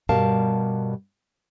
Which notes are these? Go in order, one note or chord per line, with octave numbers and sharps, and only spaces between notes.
G2 B2 G3 A#4 F5 A5